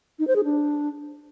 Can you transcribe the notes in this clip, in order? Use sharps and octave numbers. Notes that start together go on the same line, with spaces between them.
D#4
C5
G#4
D4